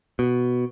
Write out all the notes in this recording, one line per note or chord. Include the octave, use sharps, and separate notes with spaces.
B2